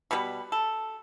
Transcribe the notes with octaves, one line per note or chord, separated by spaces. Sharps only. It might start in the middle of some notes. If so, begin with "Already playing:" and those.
B2 G3 B3 B4
A4